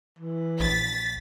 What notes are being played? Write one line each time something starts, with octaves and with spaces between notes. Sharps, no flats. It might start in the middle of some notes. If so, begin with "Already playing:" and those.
E3
A#1 A6 B6